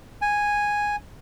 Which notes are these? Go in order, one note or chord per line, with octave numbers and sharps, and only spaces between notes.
G#5